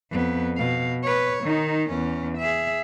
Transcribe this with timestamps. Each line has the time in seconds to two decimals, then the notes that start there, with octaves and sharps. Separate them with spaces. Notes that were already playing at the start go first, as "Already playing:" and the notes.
0.11 F2 B3
0.57 B2 F5
1.03 B4 C#5
1.44 D#3 D#4
1.90 E2 C#4
2.38 G#4 E5